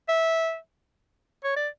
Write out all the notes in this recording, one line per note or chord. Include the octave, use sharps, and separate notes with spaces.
E5
C#5
D5